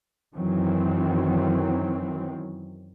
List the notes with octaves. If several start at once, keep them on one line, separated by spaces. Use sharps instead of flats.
F#2 D#3 E3 F#3 C4